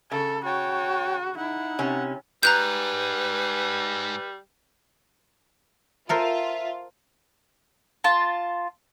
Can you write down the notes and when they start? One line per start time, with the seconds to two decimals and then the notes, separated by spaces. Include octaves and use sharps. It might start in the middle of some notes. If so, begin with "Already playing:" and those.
0.11 C#3 A4
0.45 F#4 C#5 G5 A5
1.37 D#4 E4 F#5
1.79 C3 C#4
2.43 G#2 G3 B4 A#5 F#6 G6
6.09 F4 A4 A#4 C5 E5
8.04 F4 A5